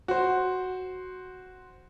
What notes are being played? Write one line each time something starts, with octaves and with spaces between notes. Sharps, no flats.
F#4 C5